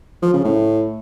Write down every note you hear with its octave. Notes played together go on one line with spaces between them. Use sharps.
F3
C#3
A2